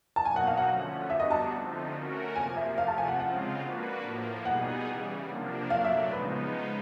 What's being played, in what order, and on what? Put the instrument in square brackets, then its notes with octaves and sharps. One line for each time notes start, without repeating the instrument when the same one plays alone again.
[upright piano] A5
[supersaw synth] B2 F#3 A#3 D#4 F#4 [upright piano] G#5
[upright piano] F#5
F5
F#5
[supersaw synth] D3 F3 A3 C#4
[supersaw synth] G3 B3 D4 F#4 [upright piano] E5
[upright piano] D#5
A5
[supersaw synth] D3 F3 A3 C4 D#4
A3 C#4 F#4 A#4
[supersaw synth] C3 F3 A#3 [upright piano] G#5
[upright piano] E5
[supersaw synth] C3 F3 A3 [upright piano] F5
[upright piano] A5
G#5
F#5
[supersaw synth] C#3 F3 G#3 C4 F4 [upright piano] F#5
[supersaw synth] A#3 D4 F#4 B4
A2 F3 A#3
[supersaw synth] B2 G3 B3 D#4 G#4 [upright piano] F#5
[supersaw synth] C#3 E3 G3
C3 F3 A#3 D4
[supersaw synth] A#2 F#3 A3 D4 [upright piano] F5
[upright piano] E5
[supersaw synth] C#3 F3 G#3 B3 D#4 [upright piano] B4